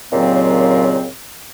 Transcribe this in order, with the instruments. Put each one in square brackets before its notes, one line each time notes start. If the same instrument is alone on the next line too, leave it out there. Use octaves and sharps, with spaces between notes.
[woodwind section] D#2 A#2 C#3 F#3 C4